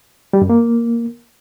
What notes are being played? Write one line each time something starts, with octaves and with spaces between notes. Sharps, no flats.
G3
F#2
A#3